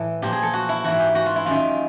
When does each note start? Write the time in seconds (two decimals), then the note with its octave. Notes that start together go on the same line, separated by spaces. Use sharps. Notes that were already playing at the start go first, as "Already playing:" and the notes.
Already playing: A2 E3 A4
0.22 A#2 F3 G4
0.32 G#4
0.43 A4
0.54 F#4
0.69 E4
0.84 G#2 E3 F#4
1.00 G4
1.15 F#4
1.26 F4
1.36 E4
1.46 F#2 D#3 F4